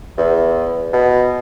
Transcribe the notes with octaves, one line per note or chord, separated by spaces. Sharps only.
E2
B2